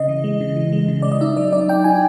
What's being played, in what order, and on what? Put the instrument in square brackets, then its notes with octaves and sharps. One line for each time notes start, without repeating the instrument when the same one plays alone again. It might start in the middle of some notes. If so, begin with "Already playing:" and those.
Already playing: [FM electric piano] C#3 D#5
E3
G#3
C#3
E3
G#3
C#3
G#3 D5
D#5
D#4 E5
F#3 D5
D#4 D5
D#4 G5
D#4 G#5